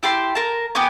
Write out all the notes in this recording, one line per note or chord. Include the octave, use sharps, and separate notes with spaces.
E4 G4 A5 C6
A#4 A5
B3 G4 G#5 D6